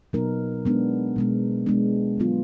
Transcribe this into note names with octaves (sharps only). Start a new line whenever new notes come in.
B2 F#3 B3 D#4 A#4
G#3 B3 D4
B2 G#3 B3
G#3 B3 D4
D3 F#3 B3 F4